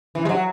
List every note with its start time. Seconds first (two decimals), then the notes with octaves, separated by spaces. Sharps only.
0.15 E3
0.25 G#3
0.29 F#3